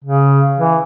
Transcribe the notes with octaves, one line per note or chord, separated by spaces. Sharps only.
C#3
E3